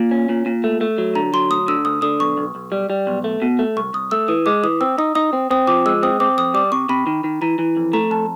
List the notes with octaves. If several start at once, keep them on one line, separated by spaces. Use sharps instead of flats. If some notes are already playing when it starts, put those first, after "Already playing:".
Already playing: A#2
C#4
A#2
A#2
A3
A3
F#3
D3 A#5
F#3 C6
D2 D#6
D3 E6
D2 D#6
D3 D#6
B1 C#6
B1
B1
G3
G3
B1
A3
B2
A3
C2 C#6
C2 D#6
A3 E6
E3 D#6
G#3 D6
E3 D#6
C4 E6
D#4 D#6
D#4 D#6
C4
C4 D#6
F3 D6
G#3 E6
C4 D#6
C4 D6
F2 D#6
G3 D6
C3 C#6
C3 B5
D#3
D#3
E3 A#5
E3
F2
A3 A#5
F2 A5